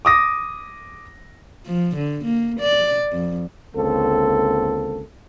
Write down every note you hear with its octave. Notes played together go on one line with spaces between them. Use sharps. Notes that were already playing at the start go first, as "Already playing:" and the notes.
D6 D#6 A#6
F3
D3
A#3
D5
F2
C#2 D3 A#3 C4 A4